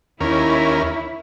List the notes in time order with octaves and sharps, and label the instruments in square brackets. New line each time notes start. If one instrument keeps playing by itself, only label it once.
[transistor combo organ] D#2 C#4 A#4 [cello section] E4